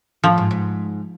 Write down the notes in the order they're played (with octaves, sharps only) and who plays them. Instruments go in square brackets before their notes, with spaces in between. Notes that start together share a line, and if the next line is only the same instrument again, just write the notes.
[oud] A2 [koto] F3
[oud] G#2
G#2